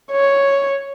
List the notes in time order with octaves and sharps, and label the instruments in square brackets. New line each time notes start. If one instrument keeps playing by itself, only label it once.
[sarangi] C#5